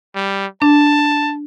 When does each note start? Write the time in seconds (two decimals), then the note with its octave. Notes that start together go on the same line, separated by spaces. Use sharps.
0.15 G3
0.62 D4 A5